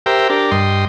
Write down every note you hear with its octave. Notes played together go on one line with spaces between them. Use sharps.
G4 A#4 C5 E5 G5
D4 G4 A#4
G2 D#5 G5 C6